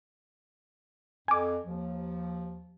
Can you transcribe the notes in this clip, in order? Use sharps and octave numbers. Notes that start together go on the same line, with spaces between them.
F2 G#5 D6
D#2 F3